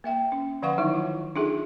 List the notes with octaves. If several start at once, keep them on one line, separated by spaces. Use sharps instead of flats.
A#3 E5 G5
C#4
D3 F3 B4 F5 F#5 C#6
D#3 F#3 D#4 E4
F4
D4 D#4 F4 G#4 A4 E5